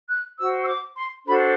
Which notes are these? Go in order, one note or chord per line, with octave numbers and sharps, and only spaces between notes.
F#6
F#4 C5 E6
E6
D6
C6
D4 F#4 A4 C5 B5